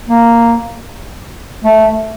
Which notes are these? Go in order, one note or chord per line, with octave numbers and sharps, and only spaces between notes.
A#3
A3